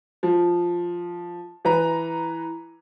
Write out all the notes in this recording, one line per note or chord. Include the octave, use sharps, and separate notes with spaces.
F3
E3 B4 A#5